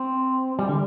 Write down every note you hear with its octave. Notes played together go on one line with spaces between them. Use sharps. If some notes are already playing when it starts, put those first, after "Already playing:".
Already playing: C4
G3
D3